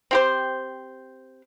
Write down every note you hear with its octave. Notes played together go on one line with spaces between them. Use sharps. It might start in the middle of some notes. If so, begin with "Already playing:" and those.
C4 G4 C5